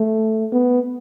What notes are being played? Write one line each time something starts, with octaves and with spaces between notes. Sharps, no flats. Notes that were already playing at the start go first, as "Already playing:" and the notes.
Already playing: A3
B3